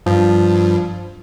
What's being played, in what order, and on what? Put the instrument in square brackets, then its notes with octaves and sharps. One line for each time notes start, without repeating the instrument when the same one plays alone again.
[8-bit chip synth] G2 [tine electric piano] F3